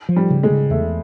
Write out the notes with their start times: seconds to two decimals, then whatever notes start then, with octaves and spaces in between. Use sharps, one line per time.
0.09 F3
0.16 G3
0.30 C#3
0.43 G#3
0.50 C#3
0.70 E2 A3